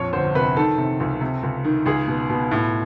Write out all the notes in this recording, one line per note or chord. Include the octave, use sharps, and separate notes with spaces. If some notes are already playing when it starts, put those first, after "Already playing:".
Already playing: A#1 F2 C#5
G1 C5
C3 B4
D#3 A4
C3
C#2
C3
C#2
D#3
C#2 G#4
B2
B2
A2